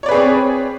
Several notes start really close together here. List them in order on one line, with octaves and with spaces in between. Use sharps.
C#5 D5 B4 G#4 C4